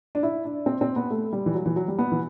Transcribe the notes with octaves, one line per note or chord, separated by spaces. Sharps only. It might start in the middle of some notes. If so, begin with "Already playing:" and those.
D4
E4
D4
C4
C4
B3
A3
G3
E3
F#3
E3
F#3
G3
B3
E3